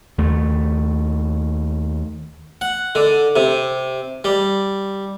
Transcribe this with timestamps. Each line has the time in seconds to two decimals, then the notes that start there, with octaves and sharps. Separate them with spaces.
0.18 D#2 A3
2.61 F#5
2.95 D3
3.36 C3
4.24 G3